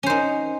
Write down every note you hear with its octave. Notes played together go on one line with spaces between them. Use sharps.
C#4 D#4 C5